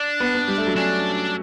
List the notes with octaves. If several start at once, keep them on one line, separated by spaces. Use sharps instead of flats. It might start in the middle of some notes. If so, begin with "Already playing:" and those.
Already playing: D4
B3
B3
G3
A3
F#3
C#4 D4